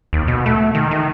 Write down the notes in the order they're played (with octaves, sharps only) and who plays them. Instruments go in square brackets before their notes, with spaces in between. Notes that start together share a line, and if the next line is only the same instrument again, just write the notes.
[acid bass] D#2
B2
A3
D#3
D#3